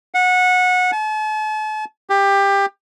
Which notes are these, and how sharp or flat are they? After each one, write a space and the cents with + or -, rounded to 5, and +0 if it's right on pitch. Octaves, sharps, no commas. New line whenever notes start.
F#5 -20
A5 -40
G4 +20